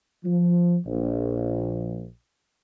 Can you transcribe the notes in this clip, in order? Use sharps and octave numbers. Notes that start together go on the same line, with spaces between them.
F3
A#1